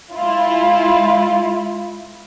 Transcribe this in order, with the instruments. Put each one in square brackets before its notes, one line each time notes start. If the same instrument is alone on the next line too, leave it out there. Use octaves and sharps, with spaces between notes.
[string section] G#3 E4 F4